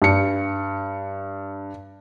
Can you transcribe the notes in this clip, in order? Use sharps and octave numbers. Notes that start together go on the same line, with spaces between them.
G2 C#7